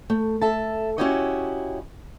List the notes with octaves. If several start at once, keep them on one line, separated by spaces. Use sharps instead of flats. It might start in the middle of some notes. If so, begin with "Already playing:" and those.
A3
A4 E5 A5
C#4 E4 F#4 G4 C#5 D#5